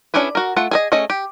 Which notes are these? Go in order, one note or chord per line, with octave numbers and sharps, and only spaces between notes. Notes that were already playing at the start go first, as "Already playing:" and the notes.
C#4 D4 E4 G#4 B4
F#4 A#4
A3 F4 F#5
G#4 A4 D#5
A3 C#4 G#4 D#5
G4